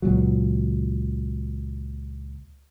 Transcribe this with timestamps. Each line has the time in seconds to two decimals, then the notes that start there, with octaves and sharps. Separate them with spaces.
0.02 C#2 A#2 F#3